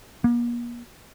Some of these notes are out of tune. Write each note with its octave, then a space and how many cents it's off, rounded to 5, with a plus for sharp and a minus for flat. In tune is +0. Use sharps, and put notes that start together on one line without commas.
A#3 +40